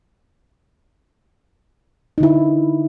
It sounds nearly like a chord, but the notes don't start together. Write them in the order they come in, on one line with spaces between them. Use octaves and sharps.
D#4 D3 E4